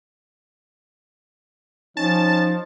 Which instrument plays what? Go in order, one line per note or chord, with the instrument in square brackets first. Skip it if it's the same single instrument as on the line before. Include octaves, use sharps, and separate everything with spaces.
[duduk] F3 [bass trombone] C#4 [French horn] D#4 [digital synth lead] A5